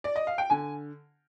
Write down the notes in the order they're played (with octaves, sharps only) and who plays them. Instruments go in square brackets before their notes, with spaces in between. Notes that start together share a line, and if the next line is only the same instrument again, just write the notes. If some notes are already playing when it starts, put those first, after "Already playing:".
[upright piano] D5
D#5
F5
G5
D3 G#5